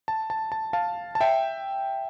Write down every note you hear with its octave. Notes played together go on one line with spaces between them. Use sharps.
A5
A5
A5
F5 A5
A5
E5 G5